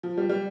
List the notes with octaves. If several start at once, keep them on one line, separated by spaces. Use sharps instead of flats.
F3
G3
G3